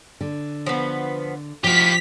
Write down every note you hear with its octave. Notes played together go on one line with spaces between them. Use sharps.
D3
F3 B3
F3 E4 F#4 G4 F5 B6